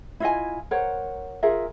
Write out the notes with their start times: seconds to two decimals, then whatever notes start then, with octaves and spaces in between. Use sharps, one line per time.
0.20 E4 F4 D#5 G#5
0.71 A#4 C5 C#5 F#5
1.43 F4 G#4 A#4 E5